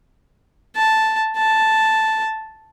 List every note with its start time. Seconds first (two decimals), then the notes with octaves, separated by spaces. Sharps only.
0.76 A5
1.37 A5